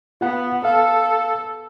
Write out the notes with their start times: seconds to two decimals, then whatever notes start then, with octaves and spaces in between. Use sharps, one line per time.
0.21 B3 F4 F#5
0.65 A4 F5